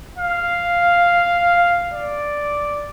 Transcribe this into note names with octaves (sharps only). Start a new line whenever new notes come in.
F5
D5